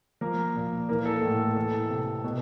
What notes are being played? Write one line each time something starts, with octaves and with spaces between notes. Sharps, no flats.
F3 A#3 A#4
A#2
E3 A#3 A#4
A4
A2 A4
A4
E3 A4
C3
B2